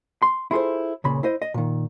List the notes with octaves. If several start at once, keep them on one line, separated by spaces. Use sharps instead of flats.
C6
E4 F4 G#4 A4 C5
C#2 A#2 C#3 B5
E4 C5 D#5
D#5
A#2 D#3